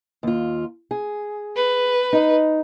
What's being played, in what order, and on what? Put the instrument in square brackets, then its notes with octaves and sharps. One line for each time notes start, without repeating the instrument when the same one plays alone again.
[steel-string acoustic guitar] D#2 F4
G#4
[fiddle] B4
[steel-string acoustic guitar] D#4 D#5